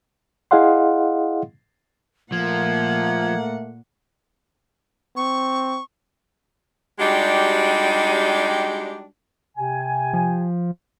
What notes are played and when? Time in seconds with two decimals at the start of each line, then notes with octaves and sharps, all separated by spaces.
0.51 E4 G#4 D#5 F5 F#5 C6
2.32 A#2 F3 A3 A#3 F#5 G#6
5.16 C4 C#6
6.99 G3 G#3 D4 D#4 F#4 G4
9.57 C3 G4 G#5
10.13 F3